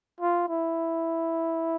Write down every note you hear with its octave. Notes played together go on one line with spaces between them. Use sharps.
F4
E4